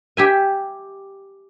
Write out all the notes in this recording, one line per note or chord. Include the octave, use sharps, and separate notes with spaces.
G4 E5 G#5